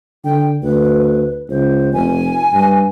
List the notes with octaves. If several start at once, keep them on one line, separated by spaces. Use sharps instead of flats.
D3 G5
D2 B4
C#2 C5
F1 G#5
G2